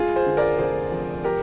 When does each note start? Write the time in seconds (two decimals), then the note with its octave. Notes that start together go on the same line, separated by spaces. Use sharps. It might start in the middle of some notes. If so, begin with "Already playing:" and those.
Already playing: G#3 F4 G#4
0.16 G#4 C5
0.26 D3
0.37 A#4 D5
0.59 F1 G#4 C5
0.92 F2
1.24 G4 A#4